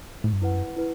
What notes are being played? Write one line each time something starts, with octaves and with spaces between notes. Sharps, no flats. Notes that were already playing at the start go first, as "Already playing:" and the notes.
A2
G2
F#2 E4 B4 F#5
E4 B4